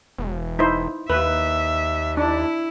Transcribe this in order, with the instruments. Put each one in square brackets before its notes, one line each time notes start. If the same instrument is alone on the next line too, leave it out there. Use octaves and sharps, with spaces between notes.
[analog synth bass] E1
[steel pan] D#4 E4 C5
[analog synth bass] D#2 [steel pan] B4 [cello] E5
[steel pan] D4 [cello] E4